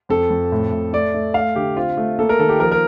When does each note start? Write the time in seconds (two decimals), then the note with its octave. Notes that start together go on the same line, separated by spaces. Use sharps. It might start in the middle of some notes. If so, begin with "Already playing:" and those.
0.09 F2 A4
0.30 F2
0.52 A2
0.73 A2
0.93 A3 D5
1.14 A3
1.34 A3 F5
1.56 D3 G4
1.76 C4 F4
1.97 A3
2.19 A#3 A4
2.29 A#4
2.39 D#3 A4
2.49 G4
2.59 F3 A#4
2.72 A#4